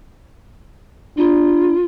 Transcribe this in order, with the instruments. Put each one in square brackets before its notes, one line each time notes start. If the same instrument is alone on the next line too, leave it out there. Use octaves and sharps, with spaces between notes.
[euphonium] D4 [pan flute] F4